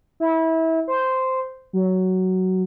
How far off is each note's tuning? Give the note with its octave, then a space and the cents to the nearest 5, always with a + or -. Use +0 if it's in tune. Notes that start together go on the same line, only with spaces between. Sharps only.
E4 -25
C5 -5
F#3 +10